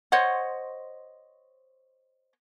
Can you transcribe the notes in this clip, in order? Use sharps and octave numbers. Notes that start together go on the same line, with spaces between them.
C5 C#5 D#5 F#5